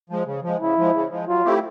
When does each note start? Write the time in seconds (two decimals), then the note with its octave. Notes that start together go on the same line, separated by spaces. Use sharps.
0.09 F3 G#3
0.27 C#3
0.43 F3 G#3
0.61 C#3 E4
0.78 F3 G#3
0.94 C#3
1.11 F3 G#3
1.28 F#3 F4
1.45 A3 C4 E4 G4